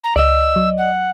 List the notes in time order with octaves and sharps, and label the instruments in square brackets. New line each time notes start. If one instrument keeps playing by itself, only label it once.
[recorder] A#5
[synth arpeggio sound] C#2 [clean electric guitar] D5 D#5 [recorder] E6
[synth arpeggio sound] F#3
[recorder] F#5